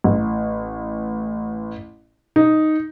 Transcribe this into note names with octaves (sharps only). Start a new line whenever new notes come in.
A1
D#4